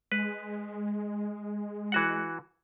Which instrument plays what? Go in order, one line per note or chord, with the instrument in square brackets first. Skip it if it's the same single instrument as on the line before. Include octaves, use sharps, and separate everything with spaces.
[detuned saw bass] G#3 [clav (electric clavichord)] B4
[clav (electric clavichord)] E3 F#4 F#5